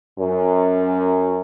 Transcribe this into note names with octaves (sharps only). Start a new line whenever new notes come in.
F#2